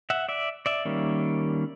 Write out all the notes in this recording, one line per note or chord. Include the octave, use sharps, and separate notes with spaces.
E5 F#5
D5 E5
D5 E5
D#3 G3 A#3 C#4